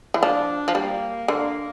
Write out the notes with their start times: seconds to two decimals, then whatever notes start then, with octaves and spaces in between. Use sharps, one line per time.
0.14 E3
0.22 F3 D4
0.68 F3
0.75 G3 A#3
1.27 D3 A#3